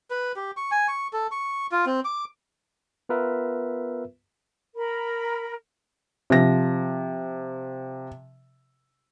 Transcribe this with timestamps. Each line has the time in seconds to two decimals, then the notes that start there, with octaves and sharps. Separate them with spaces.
0.10 B4
0.36 G4
0.57 C#6
0.71 G#5
0.88 C#6
1.13 A4
1.31 C#6
1.72 F4
1.86 C4
2.05 D6
3.09 B3 F4 A#4 B4 E5
4.75 A#4 B5
6.30 C3 F3 A#6